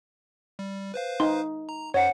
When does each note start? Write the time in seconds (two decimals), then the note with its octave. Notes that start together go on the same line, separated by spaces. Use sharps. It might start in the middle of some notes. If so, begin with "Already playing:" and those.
0.59 G3
0.94 B4 C5 F5
1.20 D#4 C6
1.69 A#5
1.94 F#2 C5 C#5 D#5 F#5